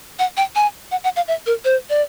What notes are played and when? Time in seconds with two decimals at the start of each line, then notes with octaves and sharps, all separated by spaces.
0.19 F#5
0.37 G5
0.56 G#5
0.91 F#5
1.04 F#5
1.16 F5
1.28 E5
1.46 A#4
1.65 C5
1.90 D5